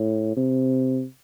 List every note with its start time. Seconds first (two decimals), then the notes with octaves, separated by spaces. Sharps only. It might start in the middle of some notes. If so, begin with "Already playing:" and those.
Already playing: A2
0.36 C3